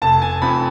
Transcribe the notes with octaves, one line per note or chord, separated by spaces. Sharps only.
F1 A5
G#5
F2 F3 B5